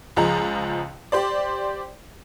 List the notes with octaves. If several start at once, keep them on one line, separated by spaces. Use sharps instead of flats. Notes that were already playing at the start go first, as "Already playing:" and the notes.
C#2 F3 G#3 A#5
G4 C5 D5